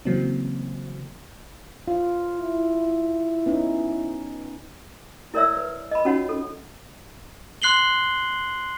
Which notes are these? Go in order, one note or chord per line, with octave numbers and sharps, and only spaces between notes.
C#3 E3 F#3 A#3 C4
F4
E4
B3 C#4 D#4
E4 A#4 C#5 D5 E5 E6
B4
D#5 B5
C#4 D#4 F4 F#4 C#5 F#5
A4
C6 F#6 C7 F#7 G7